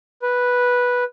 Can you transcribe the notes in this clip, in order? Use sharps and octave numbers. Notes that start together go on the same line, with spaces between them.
B4